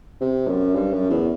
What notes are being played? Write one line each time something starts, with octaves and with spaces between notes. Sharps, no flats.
C3
F#2
G2
F#2
E2